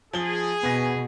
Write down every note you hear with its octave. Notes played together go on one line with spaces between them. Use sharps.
F3 G#4 G7
B2 B3 G#5 A#6